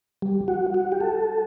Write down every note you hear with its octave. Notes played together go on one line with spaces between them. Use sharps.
G3
F#4
F#4
G4
A4